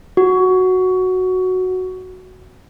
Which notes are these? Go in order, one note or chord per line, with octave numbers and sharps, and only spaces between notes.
F#4